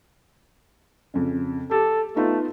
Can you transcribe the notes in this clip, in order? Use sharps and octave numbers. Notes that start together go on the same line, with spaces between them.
F2 C#3
G4 A4
A3 B3 D#4 F4